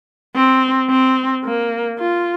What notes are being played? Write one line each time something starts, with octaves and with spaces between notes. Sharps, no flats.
C4
C4
A#3
F4